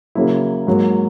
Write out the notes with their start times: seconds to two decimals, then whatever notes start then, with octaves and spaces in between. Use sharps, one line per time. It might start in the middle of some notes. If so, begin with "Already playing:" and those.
0.15 C#3 F#3 A#3 E4
0.67 G#2 F#3 A#3